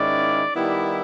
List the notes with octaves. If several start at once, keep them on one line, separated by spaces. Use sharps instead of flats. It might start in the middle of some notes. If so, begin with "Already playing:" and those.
Already playing: G#2 D#3 G#3 C#4 E4 D5
D#3 G3 B3 E4